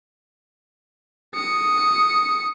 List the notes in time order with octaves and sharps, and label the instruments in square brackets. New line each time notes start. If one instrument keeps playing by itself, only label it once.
[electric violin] D#6 C#7